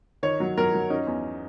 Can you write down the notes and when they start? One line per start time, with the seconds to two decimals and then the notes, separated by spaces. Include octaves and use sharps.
0.23 D#3 C#5
0.40 F#3
0.58 F#3 A#4
0.74 F#3
0.90 C#4 D#4
1.07 E2